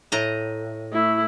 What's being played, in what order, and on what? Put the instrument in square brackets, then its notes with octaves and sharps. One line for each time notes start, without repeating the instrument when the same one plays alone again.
[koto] A2 D#5 A#5
[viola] A3 E4